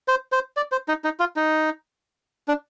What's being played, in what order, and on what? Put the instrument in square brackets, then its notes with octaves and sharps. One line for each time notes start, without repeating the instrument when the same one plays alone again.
[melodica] C5
C5
D5
C5
D#4
D#4
F4
D#4
D4